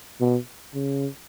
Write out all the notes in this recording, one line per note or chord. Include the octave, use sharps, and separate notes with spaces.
B2
C#3